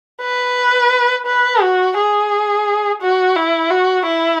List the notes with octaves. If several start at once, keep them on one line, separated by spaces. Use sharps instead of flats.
B4
B4
F#4
G#4
F#4
E4
F#4
E4